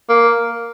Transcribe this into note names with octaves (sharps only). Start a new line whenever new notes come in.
A#3